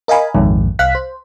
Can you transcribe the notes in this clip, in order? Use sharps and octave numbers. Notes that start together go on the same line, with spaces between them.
A#4 D#5 F5 G#5 B5
A#1 F2 G#2 D#3
C2 F5 F#6 B6
C5